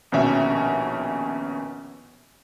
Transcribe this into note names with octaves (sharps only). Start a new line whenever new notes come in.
A#1 D#2 B2 C#4 F#4 E5